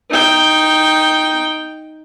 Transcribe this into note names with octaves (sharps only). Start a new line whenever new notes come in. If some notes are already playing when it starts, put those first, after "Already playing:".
D#4 G5